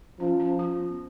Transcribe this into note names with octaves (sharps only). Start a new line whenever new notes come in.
F3 C#4
C#4
F4
B3